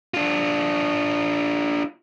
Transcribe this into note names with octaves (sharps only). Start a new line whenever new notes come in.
D4 F4